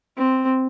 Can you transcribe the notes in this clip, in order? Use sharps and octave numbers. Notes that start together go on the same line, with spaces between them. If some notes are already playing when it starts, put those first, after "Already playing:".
C4